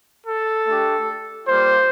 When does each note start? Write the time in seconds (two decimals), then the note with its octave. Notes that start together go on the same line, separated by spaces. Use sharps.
0.27 A4
0.67 A3 D4 G4
1.47 G3 A#3 F4 C5